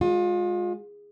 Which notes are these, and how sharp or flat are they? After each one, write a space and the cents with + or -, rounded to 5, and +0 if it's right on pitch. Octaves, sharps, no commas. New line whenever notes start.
G#3 -10 F4 +30